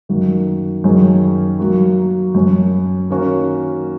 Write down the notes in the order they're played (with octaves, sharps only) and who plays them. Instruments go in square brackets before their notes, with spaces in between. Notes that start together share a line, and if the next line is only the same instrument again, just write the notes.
[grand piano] F#2 D#3 A#3 F#4
F#2 D#3 A#3 C#4 G#4
F#3 A#3 F#4
F#2 F#3 C#4 F#4
D#3 A#3 C#4 F#4